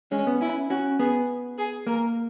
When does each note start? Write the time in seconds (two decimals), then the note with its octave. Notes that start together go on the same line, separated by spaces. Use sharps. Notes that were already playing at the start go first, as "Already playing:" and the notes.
0.11 G#3 C#4
0.27 B3
0.41 C#4 E4
0.70 C#4 F#4
0.99 B3 G#4
1.58 G#4
1.87 A#3 A#4